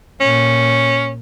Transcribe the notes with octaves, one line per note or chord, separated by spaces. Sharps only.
A#2 C#4